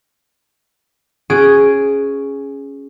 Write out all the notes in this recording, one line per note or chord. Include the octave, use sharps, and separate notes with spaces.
C#4 F#4 G#4 D7